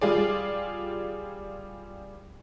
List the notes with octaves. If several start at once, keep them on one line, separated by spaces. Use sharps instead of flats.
G3 F4 G#4 D5